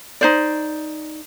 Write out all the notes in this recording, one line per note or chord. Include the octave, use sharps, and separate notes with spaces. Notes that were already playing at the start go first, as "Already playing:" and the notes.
D#4 C5 D5